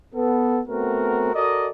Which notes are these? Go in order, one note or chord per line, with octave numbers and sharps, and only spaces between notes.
B3 A4
A3 B3 C4 F#4 A#4
F#4 A4 A#4 D5 D#5